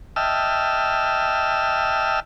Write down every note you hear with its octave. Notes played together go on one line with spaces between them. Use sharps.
D#5 E5 G5 A5 E6 F6